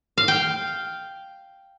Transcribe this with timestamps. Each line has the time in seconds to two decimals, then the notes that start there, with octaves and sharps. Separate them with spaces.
0.18 F5
0.28 G5